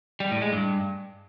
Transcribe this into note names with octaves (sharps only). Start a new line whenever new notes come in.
G3
A2
G#3
G2